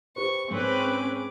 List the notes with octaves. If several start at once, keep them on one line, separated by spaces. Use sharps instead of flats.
G4 B4 C5 C#6
G#2 C4 C#4 G#4 B4 D6